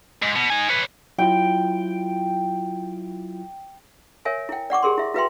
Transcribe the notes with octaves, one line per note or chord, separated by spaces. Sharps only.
G#2
B2
D#4 G#5
B4 C#5
F#3 E4 F4 G5
A#4 C#5 E5 G#5
E4 G5
D5 F#5 C#6 D6
G4 G#4 A#4 C6
E4 E5
E4 F#4 B4 E5 G5 C6